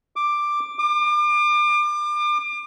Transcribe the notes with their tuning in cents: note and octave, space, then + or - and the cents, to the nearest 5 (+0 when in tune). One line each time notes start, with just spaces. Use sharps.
D6 +10
D6 +35